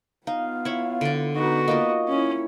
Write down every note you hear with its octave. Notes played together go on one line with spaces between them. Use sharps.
B3 D#4 F4 F5
E4 C#5
D3 D5
B3 D#4 F#4 B4
A#3 D#4 F4 D#5
C#4 E4 C#5